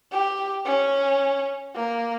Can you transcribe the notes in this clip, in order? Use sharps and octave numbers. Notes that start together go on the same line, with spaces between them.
G4
C#4
A#3